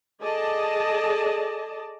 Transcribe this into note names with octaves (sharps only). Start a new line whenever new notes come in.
G#4 A4 D5 D#5 A5